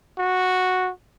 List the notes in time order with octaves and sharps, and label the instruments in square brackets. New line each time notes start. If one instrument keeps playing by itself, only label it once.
[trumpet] F#4